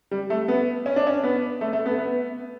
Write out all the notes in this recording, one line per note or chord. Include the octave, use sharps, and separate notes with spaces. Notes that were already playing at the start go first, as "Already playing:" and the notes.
G3
A3
B3
C#4
D4
C#4
B3
A3
A3
B3
B3